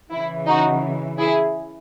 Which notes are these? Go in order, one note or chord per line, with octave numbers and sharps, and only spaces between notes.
C#3 E3 E4
D#4 F#4
E4 G#4